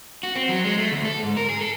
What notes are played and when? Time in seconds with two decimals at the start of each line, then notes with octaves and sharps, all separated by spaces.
0.23 F#4
0.35 C4
0.49 F#3
0.64 G#3
0.78 A3
0.92 D2
1.05 A4
1.23 G#2
1.37 A#4
1.49 G#4
1.61 A4